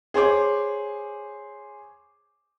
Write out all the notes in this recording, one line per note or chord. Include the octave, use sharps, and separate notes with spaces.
G#4 C5 C#5 D6